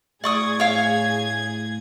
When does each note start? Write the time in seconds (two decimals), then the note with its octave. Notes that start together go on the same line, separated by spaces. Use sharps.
0.24 A2 G#4 D5 C#6 D#6 G#6
0.60 C#5 F5